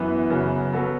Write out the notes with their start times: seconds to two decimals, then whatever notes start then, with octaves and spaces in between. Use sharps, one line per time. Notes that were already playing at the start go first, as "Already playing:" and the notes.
Already playing: F#2 E3 B3
0.30 F#2 C#3 F#3 B3
0.73 F#3 B3 F#4 A4